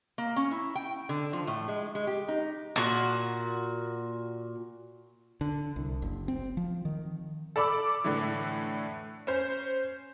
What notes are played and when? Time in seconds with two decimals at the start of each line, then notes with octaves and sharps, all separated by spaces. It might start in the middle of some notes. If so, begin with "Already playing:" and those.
0.18 A#3
0.36 C#4
0.51 E4
0.75 G5
1.09 D3
1.33 F3
1.47 A2
1.68 G#3
1.95 G#3
2.07 G4
2.28 D#4
2.76 A#2 F#4
5.41 D3
5.76 C2
6.02 F#1
6.28 C4
6.57 F3
6.85 D#3
7.56 A4 D5 B5 D6 E6
8.04 A2 D3 E3
9.27 C#4 C5